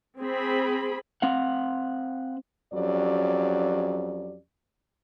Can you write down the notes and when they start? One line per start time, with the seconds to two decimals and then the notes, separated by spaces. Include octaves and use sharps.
0.21 C4 G#4 B5
1.22 C4 F5 F#5
2.73 F2 F#3 C#4 G4 D5